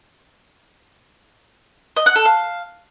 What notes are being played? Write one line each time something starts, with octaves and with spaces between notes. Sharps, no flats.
D#5
F#5
A4
F5